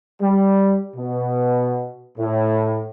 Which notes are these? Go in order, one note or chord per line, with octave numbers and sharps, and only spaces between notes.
G3
B2
A2